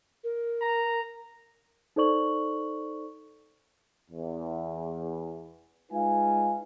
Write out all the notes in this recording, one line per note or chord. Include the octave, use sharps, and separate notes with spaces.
A#4
A#5
D#4 A4 C5 D5 C#6 F#7
E2
G#3 D#4 F4 B4 F5 G#5